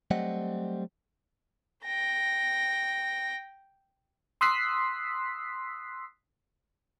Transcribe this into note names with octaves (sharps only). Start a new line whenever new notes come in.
F#3 G3 A3 C4 D#5 F#5
G5 A#6
C6 D#6 E6 F#6 B6 C7